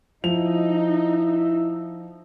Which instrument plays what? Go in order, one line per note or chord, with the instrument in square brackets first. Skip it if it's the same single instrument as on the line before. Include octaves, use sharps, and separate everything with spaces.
[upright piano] F3 F7 [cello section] D#4 [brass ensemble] E4 E5